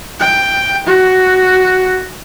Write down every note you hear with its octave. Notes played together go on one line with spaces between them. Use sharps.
G5
F#4